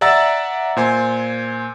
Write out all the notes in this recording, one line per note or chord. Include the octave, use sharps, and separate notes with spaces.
D5 E5 F#5 A#5 E6 A6
A#2 C5 G#5